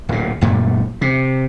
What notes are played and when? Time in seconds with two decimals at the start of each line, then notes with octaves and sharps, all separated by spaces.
0.09 D1 A#2
0.41 D#1 F#2 A#2 A3
1.01 C3